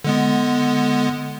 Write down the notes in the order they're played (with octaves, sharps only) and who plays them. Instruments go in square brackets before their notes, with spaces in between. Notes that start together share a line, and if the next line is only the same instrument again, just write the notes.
[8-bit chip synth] D3 G#3 B3